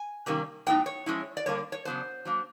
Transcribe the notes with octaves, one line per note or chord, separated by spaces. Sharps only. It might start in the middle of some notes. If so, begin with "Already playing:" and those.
Already playing: G#5
C3 D#3 G3 A#3 C#4
A2 F#3 B3 D#4 G5
C#5
F3 G#3 C#4 E4
D5
D3 G3 A#3 D4 C#5
C#5
C#3 F#3 B3 D4 C5
F#3 A#3 D4